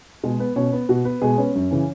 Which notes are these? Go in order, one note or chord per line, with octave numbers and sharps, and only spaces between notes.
B2 G#3 G#4
B3 B4
B2 C#4 C#5
B3 B4
B2 F#4
B3 B4
B2 G#3 G#4
B3 C#4 C#5
F#2
C#3 E3